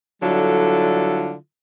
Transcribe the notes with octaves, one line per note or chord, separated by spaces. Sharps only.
D3 F#3 G3 E4 F4 A4